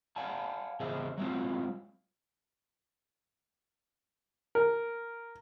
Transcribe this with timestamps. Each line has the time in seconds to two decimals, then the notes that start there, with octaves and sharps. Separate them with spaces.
0.16 D5 F5 F#5 G#5 A5
0.80 E2 C#3 G#4 C5 D#5 E5
1.18 F#3 G#3 A3 C4 F4 F#4
4.55 A#4